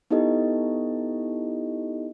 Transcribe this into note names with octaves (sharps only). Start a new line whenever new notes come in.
B3 D#4 E4 G4 A4 D#5